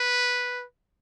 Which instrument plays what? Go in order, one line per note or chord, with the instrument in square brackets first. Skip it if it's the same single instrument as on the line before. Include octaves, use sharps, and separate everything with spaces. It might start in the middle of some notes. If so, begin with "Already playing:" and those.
Already playing: [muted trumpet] B4